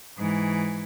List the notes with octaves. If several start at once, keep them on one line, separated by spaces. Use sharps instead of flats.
G#2 E3